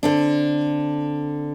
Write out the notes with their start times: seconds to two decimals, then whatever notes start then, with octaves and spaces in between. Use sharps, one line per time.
0.03 D3 C4 D4